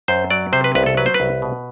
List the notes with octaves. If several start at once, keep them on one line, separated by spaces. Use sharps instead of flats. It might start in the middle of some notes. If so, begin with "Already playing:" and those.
F#2 C5
F#3 D5
C3 C5
B4
C2 B4
A4
F#3 B4
C5
B4
C2
B2